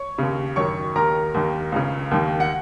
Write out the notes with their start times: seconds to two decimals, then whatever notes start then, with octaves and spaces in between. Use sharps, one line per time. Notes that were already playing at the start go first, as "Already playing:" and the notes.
Already playing: C#5 C#6
0.18 D#2 C#3
0.56 F#2 D#3 C#5 C#6
0.95 D#2 D#3 A#4 A#5
1.34 D#2 D#3
1.72 C#2 C#3
2.11 D#2 D#3
2.40 F#5